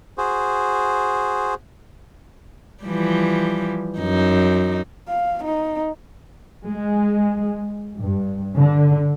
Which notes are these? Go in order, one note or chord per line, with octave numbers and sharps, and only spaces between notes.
F#4 G#4 C5
E3 F3 G3
F#2 D#4
F5
D#4
G#3
G2
D3